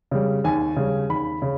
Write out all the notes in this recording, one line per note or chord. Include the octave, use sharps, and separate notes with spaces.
C#3 G3
D#2 G#5
C#3 G3
D#2 B5
C#3